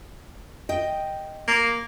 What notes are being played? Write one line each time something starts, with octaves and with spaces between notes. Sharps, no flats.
D#5 G5
A#3